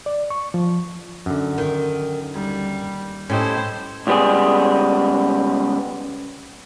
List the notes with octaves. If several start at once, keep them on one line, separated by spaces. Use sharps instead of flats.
D5
C#6
F3
F#2 D3
D#3
D#2 G3
A2 C#4 G4 A4 C5 D#5
C#2 G3 B3 G#4